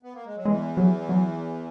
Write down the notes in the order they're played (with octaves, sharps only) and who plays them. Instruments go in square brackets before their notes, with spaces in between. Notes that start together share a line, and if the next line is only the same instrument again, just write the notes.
[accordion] B3
A#3
G#3
F#3
[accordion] E2 E3 [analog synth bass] G#3
[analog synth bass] F#3
F#3